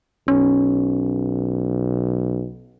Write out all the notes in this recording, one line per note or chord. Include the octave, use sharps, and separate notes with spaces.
B1 C#4